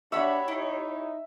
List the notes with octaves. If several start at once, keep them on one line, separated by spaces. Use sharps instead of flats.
D4 F#4 G4 C#5 E5 F#5 B5
D#4 E4